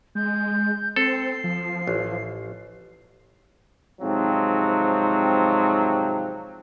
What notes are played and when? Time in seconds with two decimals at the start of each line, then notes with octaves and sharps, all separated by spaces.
0.15 G#3 G6
0.96 C4 A4 C7
1.44 F3
1.87 A1
4.01 G#2 C3 F3 F#3 C4